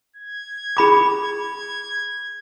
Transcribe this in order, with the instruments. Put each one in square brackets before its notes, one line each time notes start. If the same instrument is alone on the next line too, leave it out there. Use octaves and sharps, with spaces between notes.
[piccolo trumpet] G#6
[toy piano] G#4 B5 D6